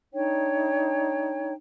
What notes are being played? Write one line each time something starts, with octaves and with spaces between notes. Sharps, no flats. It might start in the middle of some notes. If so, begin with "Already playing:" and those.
D4 D#4 C#5 G5